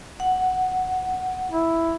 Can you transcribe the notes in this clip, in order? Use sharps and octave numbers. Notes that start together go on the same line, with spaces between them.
F#5
E4